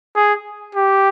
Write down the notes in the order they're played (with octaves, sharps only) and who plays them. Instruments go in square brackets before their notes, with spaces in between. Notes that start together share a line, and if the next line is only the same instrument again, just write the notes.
[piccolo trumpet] G#4
G4